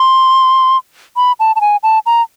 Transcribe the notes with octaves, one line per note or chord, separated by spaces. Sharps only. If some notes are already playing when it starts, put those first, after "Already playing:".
Already playing: C6
B5
A5
A5
G#5
A5
A#5